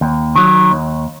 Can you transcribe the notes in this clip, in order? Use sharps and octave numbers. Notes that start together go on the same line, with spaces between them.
D#2
D#3 F#3
D#2